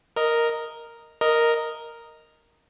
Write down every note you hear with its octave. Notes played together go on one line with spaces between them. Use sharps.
A#4 D#5
A#4 D#5